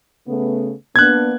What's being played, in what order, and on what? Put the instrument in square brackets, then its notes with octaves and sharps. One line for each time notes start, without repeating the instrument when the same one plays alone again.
[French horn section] C#3 A3 B3
[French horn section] A#3 B3 D4 [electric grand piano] F#6 G#6